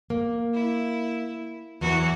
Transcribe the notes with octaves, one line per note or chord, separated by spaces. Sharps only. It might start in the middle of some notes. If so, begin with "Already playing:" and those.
A#3
E4
E2 E3 F#3 F#4